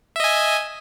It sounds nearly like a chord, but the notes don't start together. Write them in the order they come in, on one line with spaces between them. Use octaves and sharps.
E5 D#5 G#5